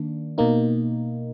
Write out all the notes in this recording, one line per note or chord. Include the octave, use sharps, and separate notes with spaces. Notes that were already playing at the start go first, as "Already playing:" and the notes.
Already playing: D#3 A#3 D4
B2 A#3 D#4